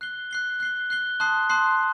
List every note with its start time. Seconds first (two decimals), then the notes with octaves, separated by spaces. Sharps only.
0.01 F#6 C7 G7
0.31 F#6 C7 G7
0.60 F#6 C7 G7
0.90 F#6 C7 G7
1.20 A5 C6 D#6 F#6 C7
1.50 A5 C6 D#6 F#6 C7